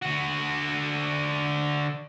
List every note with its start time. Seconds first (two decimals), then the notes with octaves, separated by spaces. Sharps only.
0.02 D3 F#4